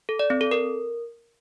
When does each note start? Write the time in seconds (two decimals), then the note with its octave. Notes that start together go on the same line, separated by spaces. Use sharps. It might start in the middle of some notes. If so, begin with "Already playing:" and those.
0.09 A4
0.19 D5
0.30 C4
0.41 A4
0.51 A#4